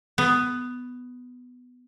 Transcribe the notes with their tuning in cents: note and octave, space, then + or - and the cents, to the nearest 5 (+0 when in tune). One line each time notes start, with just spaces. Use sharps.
B3 +10